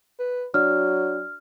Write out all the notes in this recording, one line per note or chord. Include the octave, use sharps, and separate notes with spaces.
B4
F#3 D4 F#4 D5 F6